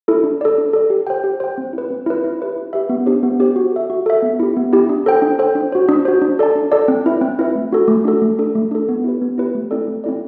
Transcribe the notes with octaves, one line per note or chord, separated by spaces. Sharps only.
E4 A4
D4
A4 D5
D4
A4 D5
G4
C5 G5
G4
C5 G5
C4
E4 B4
C4
E4 B4
E4
G4 B4 E5
E4
G4 B4 E5
B3
D4 G4 C5
B3
D4 G4 C5
F#4
A4 E5
F#4
A4 E5
B3
E4 G4
B3
E4 G4
D4
A4 C5 G5
D4
A4 C5 G5
D4
F#4 C5
D4
F#4 C5
D4
A4 D5 A5
D4
A4 D5 A5
C4
E4 B4 E5
C4
E4 B4 E5
A3
D4 F#4 A4
A3
D4 F#4 A4
A3
D4 A4
A3
D4 A4
B3
E4 G4 B4
B3
E4 G4 B4
A3
C4 E4 A4 D5
A3
C4 E4 A4 D5